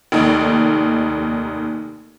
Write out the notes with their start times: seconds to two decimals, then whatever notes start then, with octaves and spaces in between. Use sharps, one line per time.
0.12 F1 D#2 D#4